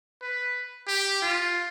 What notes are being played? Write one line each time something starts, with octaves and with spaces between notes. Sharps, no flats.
B4
G4
F4